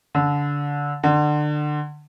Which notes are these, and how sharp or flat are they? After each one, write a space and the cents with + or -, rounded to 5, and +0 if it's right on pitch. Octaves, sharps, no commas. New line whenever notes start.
D3 -25
D3 +25